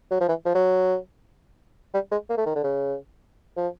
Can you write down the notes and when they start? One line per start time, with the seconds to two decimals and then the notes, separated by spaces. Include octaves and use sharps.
0.11 F#3
0.21 F3
0.29 E3
0.46 F3
0.55 F#3
1.94 G3
2.12 G#3
2.29 A#3
2.37 A3
2.46 D#3
2.55 D3
2.64 C#3
3.57 F3